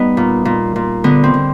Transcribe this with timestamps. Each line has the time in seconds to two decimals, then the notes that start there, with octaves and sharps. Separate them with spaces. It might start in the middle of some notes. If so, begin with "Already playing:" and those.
Already playing: G3 B3 D#4
0.17 A#2
0.45 A#2
0.76 A#2
1.04 D3 B3
1.24 C4
1.34 D3